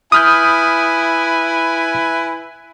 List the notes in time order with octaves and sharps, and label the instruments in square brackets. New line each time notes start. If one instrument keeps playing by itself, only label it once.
[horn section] E4 B4 G#5 [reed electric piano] D#6 F6 G6